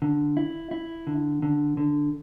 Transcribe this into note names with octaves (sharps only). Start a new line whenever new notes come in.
D3
E4
E4
D3
D3
D3